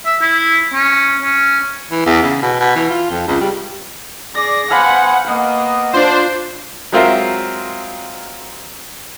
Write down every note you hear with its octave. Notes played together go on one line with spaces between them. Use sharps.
E5
E4
C#4
C#4
E3
E2
C#3
B2
B2
E3
F4
F2
C#2
G3
G#4 D5 A#6
B3 C5 F5 F#5 G#5 B5 C#6
A#3 B3 D#5
D4 F4 C5 C7
F#3 G#3 C4 F4 A#4 E5